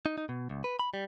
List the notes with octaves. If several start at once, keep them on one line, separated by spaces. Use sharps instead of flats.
D#4
D#4
B2
C#2
B4
B5
G3